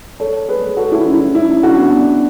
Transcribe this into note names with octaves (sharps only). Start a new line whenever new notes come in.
A4 C#5
G#4 B4
F#4 A4
E4 G#4
C#4 E4
C#4 E4
D4 F#4
B3 D4